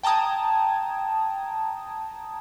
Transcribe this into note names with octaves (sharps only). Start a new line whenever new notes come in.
G5 A5 A#5 D#6 G#6